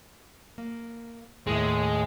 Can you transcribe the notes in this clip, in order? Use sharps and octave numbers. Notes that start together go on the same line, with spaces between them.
A#3
D#2 A2 G#3 E5